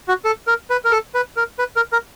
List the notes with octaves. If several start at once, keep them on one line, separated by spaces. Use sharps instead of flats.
F#4
A4
A#4
B4
A#4
A4
B4
A#4
B4
A#4
A#4